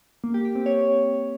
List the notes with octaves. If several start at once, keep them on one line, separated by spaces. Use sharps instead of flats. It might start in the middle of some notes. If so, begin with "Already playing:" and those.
A#3
G4
G4
C4
C#5